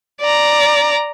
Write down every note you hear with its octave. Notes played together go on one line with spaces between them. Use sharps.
D5 A#5